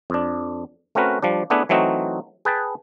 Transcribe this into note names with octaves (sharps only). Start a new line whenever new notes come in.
F2 D4
A3 C4 C#4 F#4 A#4 B4
F3 G3 D4
A3 B3 D4 E4 G#4 B4
E3 F#3 A3 C4 D#4 F#4
G#4 B4 G5 A5